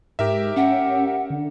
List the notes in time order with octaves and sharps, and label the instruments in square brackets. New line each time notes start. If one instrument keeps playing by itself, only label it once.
[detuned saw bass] G#2 [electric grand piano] G4 A#4 E5
[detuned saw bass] C#4 [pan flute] F#5
[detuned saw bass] D3